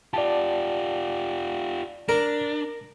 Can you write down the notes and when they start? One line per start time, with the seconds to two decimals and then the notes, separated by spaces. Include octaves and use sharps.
0.14 F4 G4 D5 A5
2.09 D4 A#4